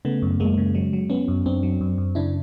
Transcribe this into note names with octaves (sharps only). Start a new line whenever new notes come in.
C#3 A3 B3
F#2
F#2 G#3 A#3
C#3
F#3 G#3
F#3
F#3 B3 C#4
F#2
F#2 C4 D4
F#3
F#2
F#2
C#3 D4 E4